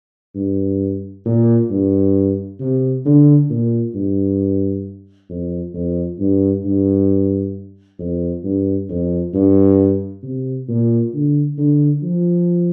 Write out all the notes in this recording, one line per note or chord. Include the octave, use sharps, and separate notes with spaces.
G2
A#2
G2
C3
D3
A#2
G2
F2
F2
G2
G2
F2
G2
F2
G2
C3
A#2
D3
D3
F3